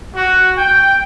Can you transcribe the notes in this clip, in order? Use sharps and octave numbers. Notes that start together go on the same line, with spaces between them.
F#4
G5